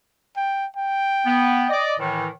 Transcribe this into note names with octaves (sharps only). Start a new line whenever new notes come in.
G5
G5
B3
D5 D#5
A2 D#3 E3